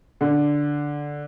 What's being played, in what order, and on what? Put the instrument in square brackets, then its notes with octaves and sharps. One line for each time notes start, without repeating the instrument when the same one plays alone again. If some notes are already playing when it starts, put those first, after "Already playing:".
[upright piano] D3